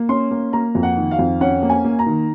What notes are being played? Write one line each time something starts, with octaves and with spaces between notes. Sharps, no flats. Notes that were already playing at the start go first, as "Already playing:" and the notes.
Already playing: A#3
C#4 C6
A#3
A#3 A#5
F2
F#5
D#3
F5
F2
C#4 F#5
A#3
G#5
A#3
A#5
D#3